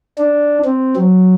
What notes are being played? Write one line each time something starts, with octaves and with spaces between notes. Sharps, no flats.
D4
C4
F#3